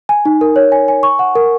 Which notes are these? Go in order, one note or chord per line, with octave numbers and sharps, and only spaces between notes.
G#5
D#4
A#4
C#5
G#5
G#5
C#6
F#5
A#4